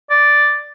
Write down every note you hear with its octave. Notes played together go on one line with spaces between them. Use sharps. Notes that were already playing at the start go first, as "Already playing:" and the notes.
D5